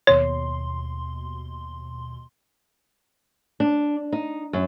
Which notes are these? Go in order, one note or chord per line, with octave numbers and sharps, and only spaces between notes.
D#2 B2 C#5 C6
D4
D#4
F#2